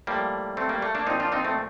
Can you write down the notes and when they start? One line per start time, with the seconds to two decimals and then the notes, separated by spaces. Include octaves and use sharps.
0.07 A2 F3 G3 A#3
0.57 A3 C4
0.69 G3 A#3
0.82 A3
0.95 A#3 D4
1.07 A#2 F3 C4 D#4
1.20 D4 F4
1.32 C4 D#4
1.44 A3 C4